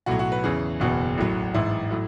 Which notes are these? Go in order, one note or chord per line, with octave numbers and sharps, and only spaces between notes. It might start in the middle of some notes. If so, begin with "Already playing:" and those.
B1 A2 F#3 F#4
F#4
B4
E2 C#3 E3 G#4
F#1 E2 B2 F#4
A1 A2 F#3
A1 G#2 E3 E4
A2 F#3